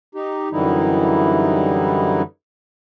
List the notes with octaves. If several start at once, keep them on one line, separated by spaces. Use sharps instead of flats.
D#4 G4
F#2 D3 E3 G3 D#4 E4